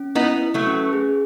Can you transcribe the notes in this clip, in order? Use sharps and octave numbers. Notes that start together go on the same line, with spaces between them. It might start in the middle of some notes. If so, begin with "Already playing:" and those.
Already playing: C#4
B3 D#4 E4
B4
F#3 A3
C#4
G#4